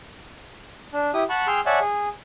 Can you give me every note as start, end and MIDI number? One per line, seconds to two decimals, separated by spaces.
0.93 1.11 62
1.14 1.23 64
1.14 1.23 67
1.14 1.23 87
1.29 1.47 78
1.29 1.47 81
1.29 1.47 83
1.29 1.47 85
1.47 1.60 68
1.47 1.60 79
1.47 1.60 84
1.47 1.60 88
1.47 1.60 89
1.66 1.79 73
1.66 1.79 74
1.66 1.79 76
1.66 1.79 78
1.66 1.79 80
1.66 1.79 81
1.81 2.08 68